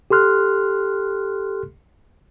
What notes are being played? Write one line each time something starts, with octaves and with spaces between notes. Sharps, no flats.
G4 A4 C6 F6 F#6